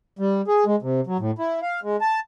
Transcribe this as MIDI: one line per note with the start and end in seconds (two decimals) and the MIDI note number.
0.19 0.41 55
0.48 0.64 68
0.66 0.76 56
0.82 1.01 48
1.07 1.17 54
1.19 1.31 45
1.39 1.60 64
1.62 1.80 77
1.83 1.96 56
2.01 2.20 81